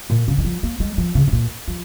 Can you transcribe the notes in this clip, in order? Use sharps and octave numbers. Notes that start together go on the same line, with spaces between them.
A#2
C#3
D#3
F3
A#3
G#3
F3
C#3
C#3
A#2
F3